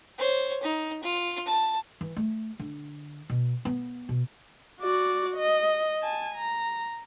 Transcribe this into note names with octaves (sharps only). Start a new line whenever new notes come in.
C5 C#5
D#4
F4
A5
E3
A3
D3
B2
B3
B2
F#4 D5
D#5
G#5 A5
A#5